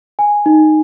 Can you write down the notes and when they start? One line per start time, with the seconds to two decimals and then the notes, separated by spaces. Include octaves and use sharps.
0.19 G#5
0.46 D#4